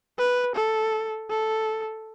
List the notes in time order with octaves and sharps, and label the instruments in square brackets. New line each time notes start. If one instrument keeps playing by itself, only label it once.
[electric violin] B4
A4
A4